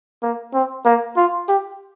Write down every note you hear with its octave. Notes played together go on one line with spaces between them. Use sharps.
A#3
C4
A#3
F4
G4